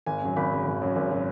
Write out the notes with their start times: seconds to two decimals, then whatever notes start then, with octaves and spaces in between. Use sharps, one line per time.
0.06 G#1 G#5
0.22 F#2 C#3 F#3
0.36 G#1 B5
0.51 F#2 C#3 F#3
0.66 G#1
0.81 F#2 C#3 F#3
0.96 G#1
1.11 C#3 F#3